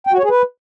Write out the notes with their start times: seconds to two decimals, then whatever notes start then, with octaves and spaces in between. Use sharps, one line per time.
0.07 G5
0.13 F#4
0.18 C#5
0.24 G#4
0.29 B4